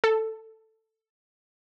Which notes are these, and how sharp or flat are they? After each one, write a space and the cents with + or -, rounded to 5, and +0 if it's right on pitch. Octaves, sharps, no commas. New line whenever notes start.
A4 +10